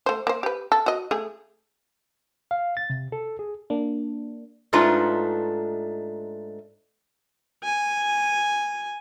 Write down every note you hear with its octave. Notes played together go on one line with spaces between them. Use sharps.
A3 C5
A#3 C5
G4 B4
A4
F#4 D#5
A3 G#4
F5
A6
C3
A4
G#4
A#3 D4
G#2 A3 D4 D#4 F4 B4
G#5